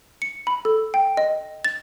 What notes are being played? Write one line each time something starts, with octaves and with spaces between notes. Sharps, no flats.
C#7
B5
A4
G5
D#5
A6